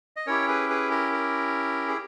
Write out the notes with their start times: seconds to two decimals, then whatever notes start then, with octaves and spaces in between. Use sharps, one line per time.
0.17 D#5
0.27 C#4 E4 G4 A#4 C#5
0.48 G#4 B4
0.70 G#4 B4
0.91 A#4
1.12 A#4
1.88 G#4